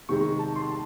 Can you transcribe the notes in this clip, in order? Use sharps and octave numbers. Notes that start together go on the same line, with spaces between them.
C3 D#3 G#3 C#6
A5
C6
A5